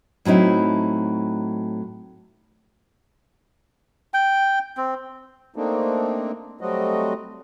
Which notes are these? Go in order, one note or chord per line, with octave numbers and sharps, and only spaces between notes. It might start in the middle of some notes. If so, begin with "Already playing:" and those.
A2 F#3 C4 D#4 E4
G5
C4
A3 A#3 C4 D4 D#4
F#3 G3 A3 C4 F#4 D#5